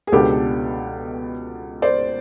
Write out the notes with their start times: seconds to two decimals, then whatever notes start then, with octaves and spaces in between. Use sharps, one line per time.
0.07 G#4
0.12 C#2 B2 G#3 B3 D4 G4 A4
1.82 C5 D5